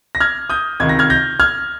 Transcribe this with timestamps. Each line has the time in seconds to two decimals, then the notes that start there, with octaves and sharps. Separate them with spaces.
0.15 A#6
0.20 F6 G#6
0.49 D#6 G6
0.80 C#2 C3 D#3 G#6
0.89 A#6
0.99 F6 G#6
1.10 G6 A#6
1.40 F6 G#6